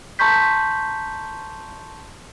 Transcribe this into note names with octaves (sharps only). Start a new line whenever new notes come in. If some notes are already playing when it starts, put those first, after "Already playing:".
A5 A#5 C6 C#6 G6 B6